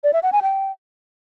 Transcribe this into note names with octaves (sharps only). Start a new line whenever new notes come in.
D5
E5
F#5
G#5
G5